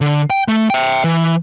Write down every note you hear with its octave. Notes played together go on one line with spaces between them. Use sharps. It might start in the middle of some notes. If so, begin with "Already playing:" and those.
D3
G5
A3
E5 G5
E3